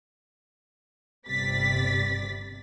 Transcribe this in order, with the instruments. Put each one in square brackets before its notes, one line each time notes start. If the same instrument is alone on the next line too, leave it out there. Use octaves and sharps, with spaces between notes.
[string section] G1 C3 G3 D5 A6 B6